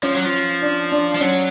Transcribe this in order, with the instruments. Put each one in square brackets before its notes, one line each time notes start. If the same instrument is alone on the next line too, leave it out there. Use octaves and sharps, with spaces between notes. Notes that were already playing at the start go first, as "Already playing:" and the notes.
[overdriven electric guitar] F3 [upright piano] C#4
[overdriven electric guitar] F#3
F3
[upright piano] D4
D4
[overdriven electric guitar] F3
[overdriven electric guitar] F#3 [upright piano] C#4